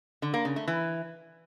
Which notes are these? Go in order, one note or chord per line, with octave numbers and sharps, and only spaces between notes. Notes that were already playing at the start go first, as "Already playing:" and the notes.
D3
A#3
C#3
A3
E3